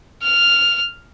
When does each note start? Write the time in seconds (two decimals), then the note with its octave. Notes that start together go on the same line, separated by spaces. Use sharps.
0.23 F6